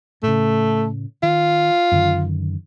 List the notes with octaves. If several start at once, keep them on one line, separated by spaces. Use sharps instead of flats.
A2 C#3 A3
D#3 F4
F#2 D3 D#3